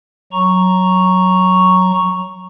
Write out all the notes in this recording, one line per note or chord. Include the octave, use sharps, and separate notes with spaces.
F#3 A#5 C#6